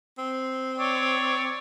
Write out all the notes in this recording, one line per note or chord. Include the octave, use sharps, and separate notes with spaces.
C4
C#5 D5